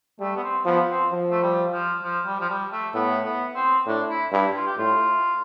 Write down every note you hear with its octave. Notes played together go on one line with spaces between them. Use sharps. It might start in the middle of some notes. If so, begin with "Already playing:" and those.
G3 A3
B3
C4
F3 B3
C4
F3
A3
G3
F3
F3
G3
F3
G3
A3
A2 B3
B3
C4
A2 D4
E4
G2 E4
F4
G4
A2 F4